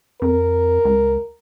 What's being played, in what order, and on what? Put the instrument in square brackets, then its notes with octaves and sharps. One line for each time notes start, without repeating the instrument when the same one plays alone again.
[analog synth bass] F2 [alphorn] A#4
[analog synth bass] C#2